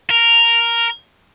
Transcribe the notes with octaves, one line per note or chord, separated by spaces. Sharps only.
A#4